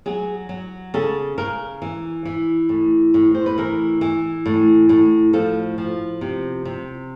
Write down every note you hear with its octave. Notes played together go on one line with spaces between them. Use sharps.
F#3 G#4
F#3
C#3 A4
C#3 A#4
E3
E3
A2
A2
C5
B4
E3 A#4
E3
A2
A2
F3 A4
F3
C3
C3